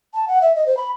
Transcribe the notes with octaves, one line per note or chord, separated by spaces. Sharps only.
A5
F#5
E5
D#5
C5
B5